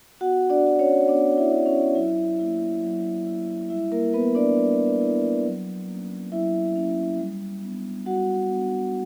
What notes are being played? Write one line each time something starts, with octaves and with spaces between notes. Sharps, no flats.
B3 F#4 F#5
D4 D5
D4 F#4
C#4 C#5
B3 D4 D5
E4 E5
D4 F#4
C#4 C#5
F#3 E4 E5
A#3 E4
F#3
A#3 E4
G3 E4 E5
A#3 A#4
B3 E4 B4
D4 D5
G3
B3 E4
F#3
A#3 C#4
F#3 E4 E5
A#3 C#4
G3
B3 D4
G3 F#4 F#5
B3 D4